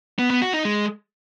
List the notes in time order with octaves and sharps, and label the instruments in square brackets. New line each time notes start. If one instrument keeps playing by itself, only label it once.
[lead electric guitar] B3
B3
F#4
D#4
G#3